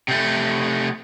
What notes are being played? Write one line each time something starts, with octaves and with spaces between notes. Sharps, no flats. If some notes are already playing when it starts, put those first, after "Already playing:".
C3 A3